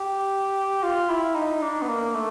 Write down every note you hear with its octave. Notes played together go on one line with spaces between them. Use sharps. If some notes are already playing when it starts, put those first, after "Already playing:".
Already playing: G4
F4
E4
D#4
D4
B3
A#3
A3